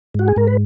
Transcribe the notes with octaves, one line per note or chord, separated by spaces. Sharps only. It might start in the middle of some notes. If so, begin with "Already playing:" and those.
G#2 F#4
G#4
G#2 A#4
B4